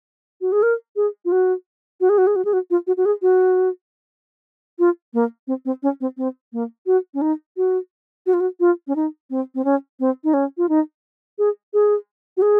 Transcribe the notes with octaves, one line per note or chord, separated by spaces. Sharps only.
F#4
G#4
A#4
G#4
F4
F#4
F#4
G#4
F#4
G#4
F#4
G#4
F#4
F4
F#4
F#4
G#4
F#4
F4
A#3
C4
C4
C#4
C4
C4
A#3
F#4
C#4
D#4
F#4
F#4
F4
F#4
F4
C#4
D#4
C4
C4
C#4
C4
D#4
C#4
F4
D#4
G#4
G#4
F#4
G#4